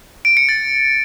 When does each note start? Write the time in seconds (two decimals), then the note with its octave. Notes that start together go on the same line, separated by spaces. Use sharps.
0.25 D7
0.37 C#7
0.49 A6